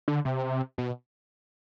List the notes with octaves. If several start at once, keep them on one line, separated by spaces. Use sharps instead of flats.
D3
C3
B2